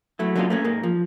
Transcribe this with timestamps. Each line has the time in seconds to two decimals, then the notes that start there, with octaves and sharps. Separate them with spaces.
0.19 F#3 A3 E4
0.36 F#3 G#3 A#3 C#4 D4 F4
0.50 A3 A#3 C#4
0.64 G#2 G#3 A#3
0.83 F3